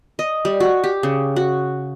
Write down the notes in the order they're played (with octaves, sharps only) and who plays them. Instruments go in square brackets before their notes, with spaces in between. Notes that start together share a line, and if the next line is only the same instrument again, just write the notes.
[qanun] D#5
G3
F#4
G4
C#3
F#4